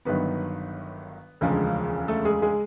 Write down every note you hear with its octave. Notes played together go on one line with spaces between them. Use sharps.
G1 G2 D#3 F#3 B3 B4
E1 D2 C#3 F3 G#3
A3 A4
G#3 G#4
G#3 G#4